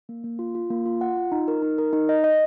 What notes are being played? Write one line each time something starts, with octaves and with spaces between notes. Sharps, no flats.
A#3
A#3
F4
F4
A#3
F4
F#5
F4
D#4
A#4
D#4
A#4
D#4
D#5
D#5